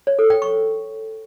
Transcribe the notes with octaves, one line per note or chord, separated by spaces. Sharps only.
C#5
A4
G5
C#6